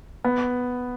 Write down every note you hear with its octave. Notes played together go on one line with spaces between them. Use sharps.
B3